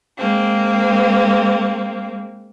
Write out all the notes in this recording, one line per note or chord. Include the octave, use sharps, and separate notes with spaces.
G#3 A#3 C4